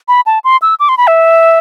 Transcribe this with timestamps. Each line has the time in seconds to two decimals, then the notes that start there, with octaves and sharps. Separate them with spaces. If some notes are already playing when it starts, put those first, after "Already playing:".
0.08 B5
0.26 A5
0.44 C6
0.62 E6
0.80 D6
0.89 C6
0.98 B5
1.07 E5